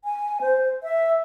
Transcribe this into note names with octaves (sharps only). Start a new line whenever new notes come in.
G#5
C5
E5